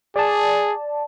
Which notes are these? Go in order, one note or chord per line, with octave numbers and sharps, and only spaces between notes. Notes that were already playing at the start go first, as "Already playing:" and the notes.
G#4 D5 A5